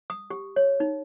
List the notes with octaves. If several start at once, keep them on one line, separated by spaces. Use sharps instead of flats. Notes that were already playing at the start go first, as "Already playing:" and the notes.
D#6
G4
C#5
D#4